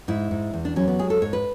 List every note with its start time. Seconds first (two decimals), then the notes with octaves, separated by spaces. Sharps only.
0.08 G#2 E4
0.31 G#2
0.53 E2
0.65 D4
0.76 F#3 C#4
0.87 B3
0.99 G#3 G#4
1.10 A4
1.22 G#2 C#5
1.33 B4